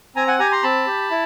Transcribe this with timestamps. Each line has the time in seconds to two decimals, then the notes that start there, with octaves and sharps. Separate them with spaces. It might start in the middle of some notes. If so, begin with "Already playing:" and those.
0.16 C4 G#5 A#5
0.27 F#5 G#5
0.39 G4 G#5 A#5
0.51 A#5 C6
0.63 C4 A5 B5
0.86 G4
1.10 E4